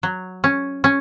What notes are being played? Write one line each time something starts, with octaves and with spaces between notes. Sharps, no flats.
F#3
C#4
C#4